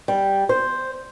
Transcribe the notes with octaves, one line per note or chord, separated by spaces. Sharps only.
G3
C5